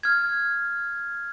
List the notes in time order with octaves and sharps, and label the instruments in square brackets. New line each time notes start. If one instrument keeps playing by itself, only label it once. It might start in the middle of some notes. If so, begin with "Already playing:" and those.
[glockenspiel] F6 G#6